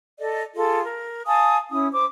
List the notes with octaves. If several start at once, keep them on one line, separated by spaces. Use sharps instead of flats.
A4 D5 D#5
F4 G#4 A4
A#4
F5 G#5 A5 D#6
C#4 E4 D#6
C5 D6